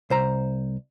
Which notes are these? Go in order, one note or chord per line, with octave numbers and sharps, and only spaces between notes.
C2 C5 A#5